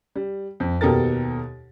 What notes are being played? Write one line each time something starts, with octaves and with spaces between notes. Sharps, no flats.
G3
F2
D#2 B2 G4 A4 A#4 A6